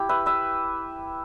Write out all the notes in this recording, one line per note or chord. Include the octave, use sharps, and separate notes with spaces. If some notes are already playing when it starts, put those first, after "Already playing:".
Already playing: E4 G4
B4 E5
B4 E5